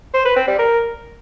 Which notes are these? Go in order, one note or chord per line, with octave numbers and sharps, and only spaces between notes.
C5
B4
C4
G3
A#4